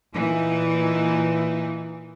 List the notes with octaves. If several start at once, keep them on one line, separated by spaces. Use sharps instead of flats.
A#2 E3 D#4